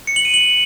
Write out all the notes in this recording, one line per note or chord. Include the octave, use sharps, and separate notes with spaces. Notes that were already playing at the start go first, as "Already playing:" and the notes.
C#7
F#7
D#7
F#7